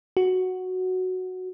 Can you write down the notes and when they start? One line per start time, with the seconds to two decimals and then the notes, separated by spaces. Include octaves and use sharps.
0.17 F#4